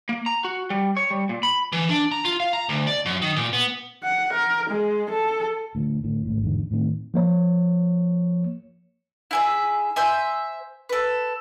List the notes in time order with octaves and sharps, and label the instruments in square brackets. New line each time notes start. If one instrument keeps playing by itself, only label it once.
[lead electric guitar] A#3
A#5
F#4
G3
C#5
G3
A#2
B5
[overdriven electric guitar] E3
D4
A#5
F4
F5
A#5
D2
D5
F#2
D#3
A#2
B3
[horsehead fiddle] F#5
A#4
G#3
A4
[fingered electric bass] D2 A#2
D2 A2
G#1 C#2 A2
E2 G#2 D3
A2 D#3 B3 C4
[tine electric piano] F3 A#3 C#5
[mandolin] E4 G#4 E5
C5 E5 G#5
A4 B4